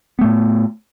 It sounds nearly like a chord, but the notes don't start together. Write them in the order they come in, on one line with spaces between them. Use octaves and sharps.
B3 A3 A2